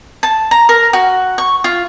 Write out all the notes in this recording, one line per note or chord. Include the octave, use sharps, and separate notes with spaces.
A5
A#5
A#4
F#4
C#6
F4